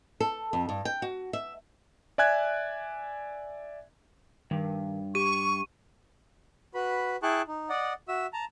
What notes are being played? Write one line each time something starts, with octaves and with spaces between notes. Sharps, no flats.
A4
F2
G2
G5
F#4
E5
D5 E5 G#5 F#6 G#6
G2 D#3
G4 C#6 D#7
F#4 B4 B5
E4 G#4 G5 A5 C#6 F#6
D#4
D5 D#5 F#5
F#4 E5 E6
A5 A#5